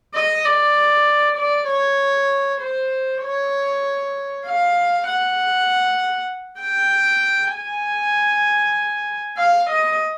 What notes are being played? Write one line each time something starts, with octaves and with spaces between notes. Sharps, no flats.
D#5
D5
D5
C#5
C5
C#5
F5
F#5
G5
G#5
F5
D#5